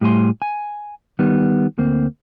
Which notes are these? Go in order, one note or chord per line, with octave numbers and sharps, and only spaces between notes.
A2 G3 A3 G#5 C6
G#5
D#3 G3 B3
D2 A#3 C4